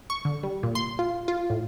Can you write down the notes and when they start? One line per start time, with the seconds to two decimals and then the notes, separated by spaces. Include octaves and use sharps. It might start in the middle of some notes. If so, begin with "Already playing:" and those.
0.10 C#6
0.25 D3
0.43 G3
0.63 A#2
0.75 C6
0.99 F4
1.28 F4
1.50 A2